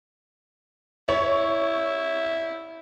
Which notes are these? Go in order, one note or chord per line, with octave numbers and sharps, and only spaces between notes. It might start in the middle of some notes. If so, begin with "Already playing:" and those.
E4 C#5